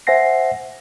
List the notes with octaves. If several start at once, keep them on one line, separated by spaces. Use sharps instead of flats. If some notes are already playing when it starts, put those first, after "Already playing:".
C5 E5 F#5 G#5 A#6 C7